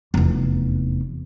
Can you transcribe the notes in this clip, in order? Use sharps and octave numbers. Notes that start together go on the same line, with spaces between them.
F1 E2